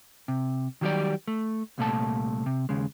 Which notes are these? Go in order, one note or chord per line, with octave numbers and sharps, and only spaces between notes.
C3
D#3 F#3 G3 F#4 G4 D5
A3
C2 A#2 A3 A5
C3
D#2 C#3 G#3